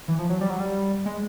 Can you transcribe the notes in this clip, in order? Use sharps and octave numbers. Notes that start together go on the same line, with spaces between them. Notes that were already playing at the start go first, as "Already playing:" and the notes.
E3
F3
F#3
G3
F#3
G3
G#3